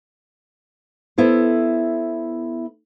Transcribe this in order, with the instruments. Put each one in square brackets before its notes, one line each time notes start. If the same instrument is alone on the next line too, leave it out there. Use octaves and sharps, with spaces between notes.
[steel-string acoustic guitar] B3 E4 A4 C5